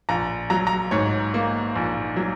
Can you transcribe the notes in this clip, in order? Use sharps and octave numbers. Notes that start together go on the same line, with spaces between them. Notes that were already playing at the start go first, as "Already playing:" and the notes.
A#1 A#5
F#3 A#5
A#5
G#2 C#5
A#3
A#1
F#3